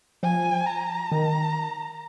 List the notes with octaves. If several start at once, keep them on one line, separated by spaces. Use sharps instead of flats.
F3 G#5
A#5
D#3